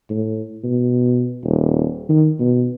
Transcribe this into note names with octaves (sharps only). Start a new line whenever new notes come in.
A2
B2
D#1
D#3
B2